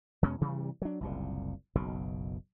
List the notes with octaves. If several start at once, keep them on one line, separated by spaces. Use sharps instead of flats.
E2 B2 G#3 C#4
G2 C3 E3 G3
F#3 D4
F#1 C2 A#2
F#1 B1 B2